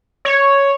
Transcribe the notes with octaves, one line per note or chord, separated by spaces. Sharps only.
C#5